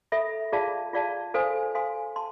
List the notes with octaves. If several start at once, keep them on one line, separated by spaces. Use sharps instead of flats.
A4 E5 B5
F4 G#4 D5 F5 A5
F4 G#4 D5 F5 A5
A4 C5 F5 G#5 C6
A4 C5 F5 G#5 C6
A5 C6